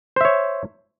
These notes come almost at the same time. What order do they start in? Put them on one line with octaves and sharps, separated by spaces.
C5 E5 C#5